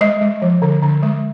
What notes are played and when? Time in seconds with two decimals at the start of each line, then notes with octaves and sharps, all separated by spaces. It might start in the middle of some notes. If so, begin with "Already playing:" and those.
0.01 G#3 D#5
0.22 G#3
0.42 F3
0.62 D3
0.82 D3
1.03 G#3